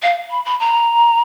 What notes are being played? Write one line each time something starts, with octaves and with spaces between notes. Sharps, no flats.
F5
B5
B5
A#5